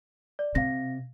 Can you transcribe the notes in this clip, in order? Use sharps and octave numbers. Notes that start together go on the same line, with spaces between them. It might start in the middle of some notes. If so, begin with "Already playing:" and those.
D5
C3 F5 A#6